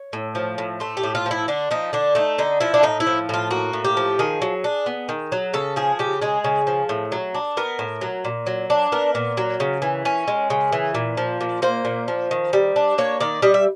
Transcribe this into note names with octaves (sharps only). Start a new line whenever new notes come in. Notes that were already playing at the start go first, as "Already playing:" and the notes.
Already playing: C#5
A2
F3
A2
A3 C5
G4
A2
F4
F3
E4
D3 D4
F3 D#4
D3 D4
A3 D#4
D3 D#4
F3 E4
D4
A2 D#4
E4
F3
A2 F4
A#3 F#4
A2
G4
F3
D#3 G#4
F#3
D4
B3
D#3
F#3
C#3 A4
F3 G#4
C#3 G4
G#3 G#4
C#3
F3
A2
F#3
D4
B3 A#4
A2
F#3
A#2
F#3
D4
B3 A#4
A#2
F#3
C#3
E3
C#4
G#3
C#3
E3
A#2
F3
A#2
A#3 C5
A#2
F3
D#3
G3
D4
A#3 C#5
D#3 D5
G3 D#5
E5